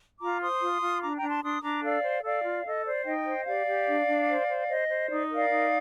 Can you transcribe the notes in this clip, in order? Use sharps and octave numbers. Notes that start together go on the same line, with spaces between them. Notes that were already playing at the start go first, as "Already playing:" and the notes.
F4 A#5 D6
C5 C6 D#6
F4
F4
D4 A#5 D6
G5 A#5
D4
A5 C6
D4 C6 D#6
D4 A#5 D6
A4 D5 F5
C5
A4 D5 F5
F4
A4 D#5
C5 D5
D#4 D#5 G5
C5
G4 D5 F5
G4
D4
D4
C5
C5
C5 D#5
C5
D#4 D5
A#4
D5 F5
D#4